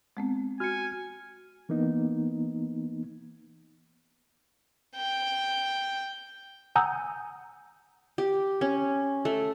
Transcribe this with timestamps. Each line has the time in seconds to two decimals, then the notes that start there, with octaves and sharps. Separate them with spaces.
0.17 G#3 B3 C4
0.60 F#4 G#5 F6 C#7
1.69 E3 A#3 B3 D#4
4.96 G5
6.76 F#5 G#5 A#5 D#6 E6 G6
8.18 G4
8.61 C#4
9.25 A3